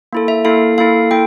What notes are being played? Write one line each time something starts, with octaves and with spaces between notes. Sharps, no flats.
A#3 E4 A4
E5
A#3 E4 A4 F5
A#3 E4 A4 F5
A#3 E4 A4 G5